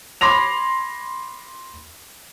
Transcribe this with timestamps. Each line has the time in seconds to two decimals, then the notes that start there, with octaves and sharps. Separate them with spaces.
0.21 B5 C6 D6 A#6 F7